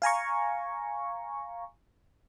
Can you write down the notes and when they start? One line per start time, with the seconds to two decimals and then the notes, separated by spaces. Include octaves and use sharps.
0.02 F5 G#5 A#5 C#6